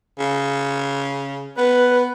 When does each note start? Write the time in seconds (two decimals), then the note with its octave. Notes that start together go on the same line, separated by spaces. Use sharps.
0.19 C#3
1.58 B3 B4